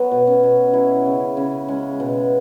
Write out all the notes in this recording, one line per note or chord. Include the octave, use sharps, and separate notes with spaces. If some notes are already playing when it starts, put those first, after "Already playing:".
Already playing: F#3 B3
B2
C#4
B2
F#3 E4
C#3
C#3
G#3 C#4
B2